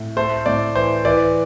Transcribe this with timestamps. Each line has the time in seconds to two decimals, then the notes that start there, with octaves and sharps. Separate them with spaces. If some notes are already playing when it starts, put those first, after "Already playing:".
Already playing: A2
0.17 A3 C5
0.46 A2 D5
0.75 E3 C5
1.05 E3 D5